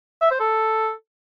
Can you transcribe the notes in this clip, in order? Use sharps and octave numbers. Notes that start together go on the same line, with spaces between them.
E5
C5
A4